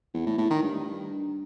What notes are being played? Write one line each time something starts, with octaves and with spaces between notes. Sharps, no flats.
E2
A2
A2
D#3
G2